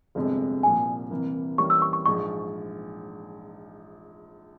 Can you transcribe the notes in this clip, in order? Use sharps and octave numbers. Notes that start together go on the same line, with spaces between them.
G1 F2 C3 F3 G#3
C2 A#2 F3 A#3 G#5
C2 C3 E3 A#3
F2 E3 G3 A#3 C#4 C#6
E6
C#6
C#6
A#1 G#2 F3 G#3 C#6